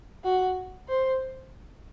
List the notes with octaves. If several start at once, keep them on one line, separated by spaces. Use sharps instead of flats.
F#4
C5